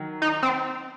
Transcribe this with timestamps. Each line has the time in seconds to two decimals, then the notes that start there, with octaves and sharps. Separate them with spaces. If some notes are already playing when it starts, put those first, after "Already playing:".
Already playing: D#3 F#3
0.22 D#4
0.42 C4